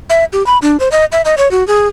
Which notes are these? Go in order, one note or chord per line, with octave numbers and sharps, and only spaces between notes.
E5
G4
B5
D4
C5
D#5
E5
D#5
C#5
F#4
G#4